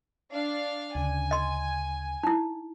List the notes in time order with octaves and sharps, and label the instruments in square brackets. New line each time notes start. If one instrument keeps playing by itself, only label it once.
[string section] D4 F5
[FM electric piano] D2 C#3 [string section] G#5
[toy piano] D#5 C6
D#4 E4